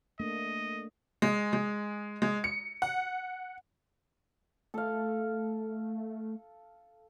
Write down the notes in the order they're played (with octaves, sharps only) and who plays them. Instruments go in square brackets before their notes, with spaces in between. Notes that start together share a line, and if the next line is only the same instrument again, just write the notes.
[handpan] A3 A#3 D4 [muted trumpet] D#5
[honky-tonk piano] G#3
G#3
G#3
C#7
F#5
[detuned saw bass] A3 [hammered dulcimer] A4 F5